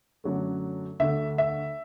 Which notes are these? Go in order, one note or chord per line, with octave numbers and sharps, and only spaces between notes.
F#2 D3 F#3 A3
D2 D3 A3 E5
E5